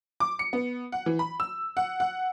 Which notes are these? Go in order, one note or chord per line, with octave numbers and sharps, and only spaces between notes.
D6
C#7
B3
F#5
E3
B5
E6
F#5
F#5